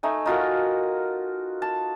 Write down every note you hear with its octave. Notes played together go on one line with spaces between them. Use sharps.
A3 D#4 G#5
D#4 F4 F#4 A#4
A5